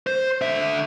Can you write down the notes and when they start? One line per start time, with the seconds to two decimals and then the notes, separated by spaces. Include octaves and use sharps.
0.07 C5
0.41 D3 E5